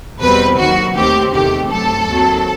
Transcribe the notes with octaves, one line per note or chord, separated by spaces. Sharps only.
E2 B2 G3 C4 B4
D#2 D#3 F#3 F#4
D#2 D#3 A3 C4 G4
E2 C3 D#3 A3 G4
G2 F#3 A3 C4 A4
D#2 D#3 F#3 C4